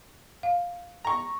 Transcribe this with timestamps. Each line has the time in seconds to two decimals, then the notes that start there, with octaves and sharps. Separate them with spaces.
0.43 F5
1.05 A#5 C#6